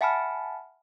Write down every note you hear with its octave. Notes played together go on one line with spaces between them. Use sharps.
E5 F#5 G#5 A5 B5 F6